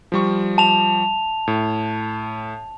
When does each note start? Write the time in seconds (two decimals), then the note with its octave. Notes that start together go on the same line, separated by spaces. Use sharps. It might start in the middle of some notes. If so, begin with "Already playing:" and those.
0.12 F3 G3 C#6
0.58 A5 F7
1.48 A2